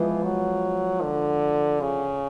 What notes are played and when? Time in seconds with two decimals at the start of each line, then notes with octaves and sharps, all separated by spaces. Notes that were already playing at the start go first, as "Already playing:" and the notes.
Already playing: E3 F3 G#3 B3
0.23 F#3
1.02 D3
1.81 C#3